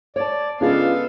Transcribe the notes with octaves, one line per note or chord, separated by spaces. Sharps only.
C#5 D5 A5
C#3 G#3 B3 D4 F4 A4 D5 F5